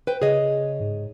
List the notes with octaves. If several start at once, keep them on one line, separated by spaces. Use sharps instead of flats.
B4 C5 G5
C#3 G#4 C#5 D#5
G#2